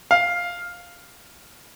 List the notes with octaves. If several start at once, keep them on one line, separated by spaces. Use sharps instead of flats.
F5